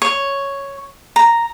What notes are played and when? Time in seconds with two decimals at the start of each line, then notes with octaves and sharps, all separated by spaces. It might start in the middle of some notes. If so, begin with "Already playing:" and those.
0.02 C#5
1.16 A#5